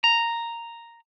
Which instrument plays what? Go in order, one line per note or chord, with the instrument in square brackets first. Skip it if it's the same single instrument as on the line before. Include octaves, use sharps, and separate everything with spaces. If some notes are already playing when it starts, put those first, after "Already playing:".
[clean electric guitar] A#5